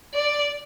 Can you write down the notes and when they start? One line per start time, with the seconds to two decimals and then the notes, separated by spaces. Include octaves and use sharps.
0.14 D5